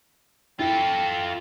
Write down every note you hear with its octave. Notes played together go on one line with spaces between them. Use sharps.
E4 F4 A4 G5